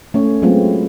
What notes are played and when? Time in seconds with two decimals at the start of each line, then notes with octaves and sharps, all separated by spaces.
0.14 A3 C#4 C#5
0.42 F#3 G#3 A3 B3 C4 F4